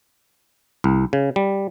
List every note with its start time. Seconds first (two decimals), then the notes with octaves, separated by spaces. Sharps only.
0.84 C2
1.13 C#3
1.36 G3